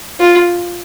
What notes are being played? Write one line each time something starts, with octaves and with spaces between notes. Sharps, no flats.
F4